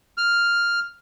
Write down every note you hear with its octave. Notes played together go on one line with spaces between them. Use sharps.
F6